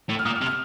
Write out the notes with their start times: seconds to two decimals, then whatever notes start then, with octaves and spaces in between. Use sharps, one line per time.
0.09 A2
0.19 F6
0.25 A#2 D#6
0.36 F6
0.41 C3
0.46 F6